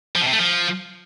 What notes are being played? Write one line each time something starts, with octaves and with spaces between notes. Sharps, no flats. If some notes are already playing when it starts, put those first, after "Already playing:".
F3
B2
C3
A3
F3